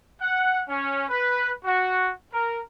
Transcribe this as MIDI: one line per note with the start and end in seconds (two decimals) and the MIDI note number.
0.20 0.60 78
0.68 1.04 61
1.09 1.51 71
1.64 2.10 66
2.32 2.60 70